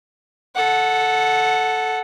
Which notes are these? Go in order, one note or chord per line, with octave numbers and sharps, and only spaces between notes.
A4 F#5